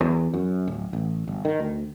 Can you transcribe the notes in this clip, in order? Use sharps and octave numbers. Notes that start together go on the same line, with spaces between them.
E2
F#2
D1
A1
G1
D#3
D2